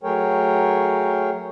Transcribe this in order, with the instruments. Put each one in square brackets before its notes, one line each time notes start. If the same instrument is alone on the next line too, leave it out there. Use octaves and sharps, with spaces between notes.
[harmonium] F#3 A3 G#4 A#4 C#5 G5